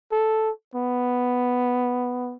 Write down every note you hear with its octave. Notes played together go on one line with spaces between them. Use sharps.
A4
B3